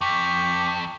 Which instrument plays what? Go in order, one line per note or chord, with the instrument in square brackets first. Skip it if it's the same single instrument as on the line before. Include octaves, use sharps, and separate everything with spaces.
[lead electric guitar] F2 [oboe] G5 [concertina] C#6 D6 [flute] B6